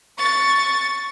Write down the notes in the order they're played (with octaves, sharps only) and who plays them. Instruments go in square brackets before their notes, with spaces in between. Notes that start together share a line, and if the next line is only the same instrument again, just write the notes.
[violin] C#6 A6